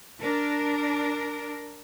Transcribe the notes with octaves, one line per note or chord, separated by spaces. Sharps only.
D4 A#4